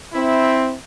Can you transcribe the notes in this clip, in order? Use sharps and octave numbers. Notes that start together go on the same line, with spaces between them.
C4 E4